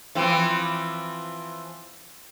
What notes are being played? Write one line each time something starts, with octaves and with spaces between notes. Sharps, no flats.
E3 F3 C4